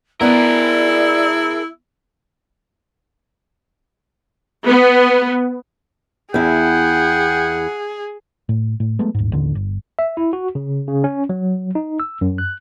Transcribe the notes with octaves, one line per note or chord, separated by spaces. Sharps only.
B3 E4 G#4 A#4 D5
B3
E2 E4 G#4 F#5 G5
A2
A2
F#3 G#3 A3 B3
D#1 G#2
A1 D#2 D3
G1
E5
E4
F#4
C#3
C#3
C#4
F#3
D#4
E6
F#2
F#6